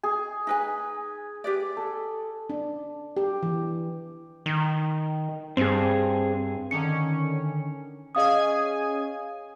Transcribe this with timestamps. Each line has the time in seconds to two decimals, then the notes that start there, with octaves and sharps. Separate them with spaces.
0.03 G#4
0.47 D#4 B4 G#5
1.44 G4 B4 D5
1.77 A4
2.50 D4
3.17 G4
3.43 E3
4.46 D#3
5.57 G2 C4 G#4
6.71 D3 D#3 C#4 C#7
8.15 C#4 G#4 D#5 F5 G#5 D#6